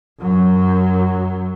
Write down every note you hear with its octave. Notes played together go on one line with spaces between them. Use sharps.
F#2 F#3